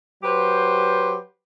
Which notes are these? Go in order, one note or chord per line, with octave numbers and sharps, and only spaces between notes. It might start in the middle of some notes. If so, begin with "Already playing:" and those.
F#3 G4 B4 C5